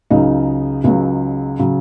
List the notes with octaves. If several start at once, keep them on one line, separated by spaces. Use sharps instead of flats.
C#2 C#3 F#3 D#4
C#2 C#3 F#3
C#3 F#3